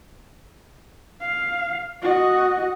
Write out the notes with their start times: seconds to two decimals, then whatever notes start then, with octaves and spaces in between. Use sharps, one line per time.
1.21 F5
2.02 F#4 D#5